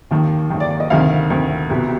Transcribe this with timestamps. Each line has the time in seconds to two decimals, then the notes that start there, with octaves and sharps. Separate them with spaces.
0.11 D#2 D#3
0.50 D#2 D#3
0.60 D5
0.70 D5
0.80 D#5
0.90 D2 C3 D#3 F5
1.30 D2 C3 D#3
1.70 C2 B2 G4